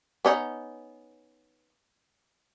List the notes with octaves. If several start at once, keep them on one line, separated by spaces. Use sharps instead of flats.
B3 C#4 D#4